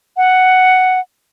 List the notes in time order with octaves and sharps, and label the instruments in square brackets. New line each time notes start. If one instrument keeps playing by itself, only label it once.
[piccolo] F#5